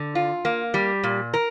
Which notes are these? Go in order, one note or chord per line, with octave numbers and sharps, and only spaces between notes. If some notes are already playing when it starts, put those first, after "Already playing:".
Already playing: D3
F4
A#3
G3
A#2
A#4